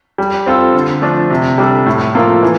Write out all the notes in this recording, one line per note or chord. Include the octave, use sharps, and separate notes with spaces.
G3
C4 F4 A4
D3
F3 A3 D4
C3
G3 D4 A4
A2
F3 A#3 F4 A4
E3